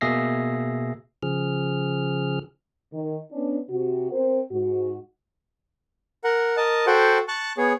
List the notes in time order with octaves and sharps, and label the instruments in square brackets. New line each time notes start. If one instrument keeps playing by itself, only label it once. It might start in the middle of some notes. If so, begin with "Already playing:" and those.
[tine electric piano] B2 A#3 G#4 E5 A#6 C7
[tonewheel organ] C#3 F3 G#4 F6
[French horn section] D#3
B3 C#4 D4
C3 F#4
C4 A#4 C5
G#2 F#4
[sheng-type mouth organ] A#4 F#5
A#4 D#5 A5
F#4 A4 C5 F#5 G5
A5 C#6 F#6
B3 G#4 C#5